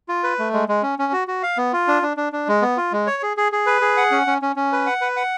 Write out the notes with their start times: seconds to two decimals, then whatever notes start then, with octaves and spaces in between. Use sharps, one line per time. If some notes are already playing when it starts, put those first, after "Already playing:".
0.08 F4
0.23 B4
0.39 A3
0.53 G#3
0.69 G#3
0.83 C#4
0.99 C#4
1.13 F#4
1.28 F#4
1.43 F5
1.57 B3
1.73 F4
1.87 D4
2.03 D4
2.17 D4
2.33 D4
2.48 G#3
2.62 B3
2.77 F4
2.92 G#3
3.07 C#5
3.23 G#4
3.37 G#4
3.52 G#4
3.66 B4
3.81 G#4
3.97 F#5
4.11 C#4
4.27 C#4
4.42 C#4
4.56 C#4
4.72 B4
4.86 F#5
5.01 B4
5.16 F#5